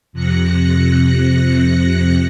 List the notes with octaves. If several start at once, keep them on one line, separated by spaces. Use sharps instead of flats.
F2 C3 F#6 A#6 C#7